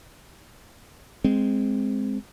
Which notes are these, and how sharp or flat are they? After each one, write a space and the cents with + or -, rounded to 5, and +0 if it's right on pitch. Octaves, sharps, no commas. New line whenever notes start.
G#3 +0 C4 -5